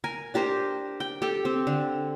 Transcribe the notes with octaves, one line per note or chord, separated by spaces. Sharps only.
A#4 G#5
D4 G4 A#4 C5
G5
G4 A4 G5
C4
D3